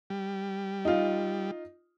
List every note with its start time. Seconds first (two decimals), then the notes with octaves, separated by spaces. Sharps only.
0.10 G3
0.85 D#4 F4